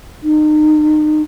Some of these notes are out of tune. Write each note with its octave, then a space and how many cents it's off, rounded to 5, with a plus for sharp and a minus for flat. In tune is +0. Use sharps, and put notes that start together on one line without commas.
D#4 -35